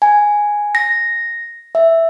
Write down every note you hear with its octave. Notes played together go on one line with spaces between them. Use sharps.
G#5
A#6
E5